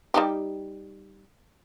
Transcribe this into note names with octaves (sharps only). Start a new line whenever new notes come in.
G3 D#4 G4